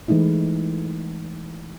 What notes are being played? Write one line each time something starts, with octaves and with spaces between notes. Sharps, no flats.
E3 G#3 A3 D#4 E4